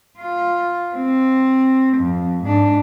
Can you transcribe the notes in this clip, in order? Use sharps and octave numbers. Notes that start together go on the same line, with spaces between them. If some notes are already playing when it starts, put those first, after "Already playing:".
F4
C4
F2
G#2 D4